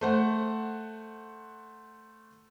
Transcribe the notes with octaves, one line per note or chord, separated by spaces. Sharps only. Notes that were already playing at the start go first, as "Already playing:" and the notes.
A3 C5 F#5